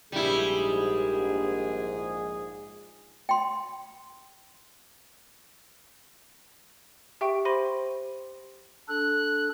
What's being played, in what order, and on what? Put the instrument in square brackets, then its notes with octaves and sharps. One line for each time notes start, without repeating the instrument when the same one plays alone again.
[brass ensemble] A#1 G#2 G#4 [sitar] G3 E4
[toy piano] G5 C6
[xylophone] G4 E5 G5 C#6 D7
G4 C5 B5 C6 A#6 D#7
[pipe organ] D4 A4 [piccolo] F#6